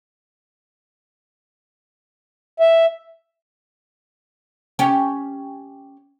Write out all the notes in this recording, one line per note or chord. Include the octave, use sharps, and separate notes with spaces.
E5
C#4 G4